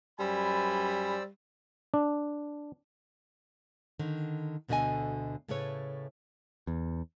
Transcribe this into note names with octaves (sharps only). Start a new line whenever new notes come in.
F#2 G3 C5 D5 G#5 B5 E6
D4
D3 D#3
D2 B2 D3 A3 D#5 G#5
A2 C#3 A3 B4 C#5
E2